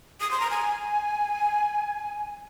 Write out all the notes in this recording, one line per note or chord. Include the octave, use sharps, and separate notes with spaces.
D#6
C6
A#5
G#5